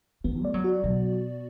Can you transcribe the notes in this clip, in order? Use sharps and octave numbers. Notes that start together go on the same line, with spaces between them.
D3 B3
A3 D5
F#3
F#4
B2 F#3